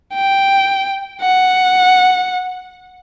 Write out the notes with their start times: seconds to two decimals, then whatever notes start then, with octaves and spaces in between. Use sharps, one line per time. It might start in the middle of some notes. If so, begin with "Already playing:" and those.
0.14 G5
1.22 F#5